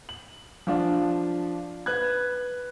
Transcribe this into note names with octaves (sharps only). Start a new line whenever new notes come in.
F#7
F3 D4 F4
B4 F#6 G#6